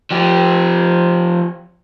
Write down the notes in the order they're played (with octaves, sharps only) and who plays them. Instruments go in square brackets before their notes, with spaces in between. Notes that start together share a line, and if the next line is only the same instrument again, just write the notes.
[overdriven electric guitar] F3 G4